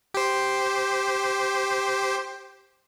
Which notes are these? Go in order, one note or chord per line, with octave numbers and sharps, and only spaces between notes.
G4 C5